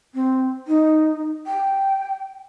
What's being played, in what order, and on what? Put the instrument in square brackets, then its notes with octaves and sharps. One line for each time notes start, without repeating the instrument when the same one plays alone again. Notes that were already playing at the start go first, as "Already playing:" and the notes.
[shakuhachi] C4
D#4
G5